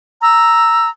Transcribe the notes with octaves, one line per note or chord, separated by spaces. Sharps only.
A#5 E6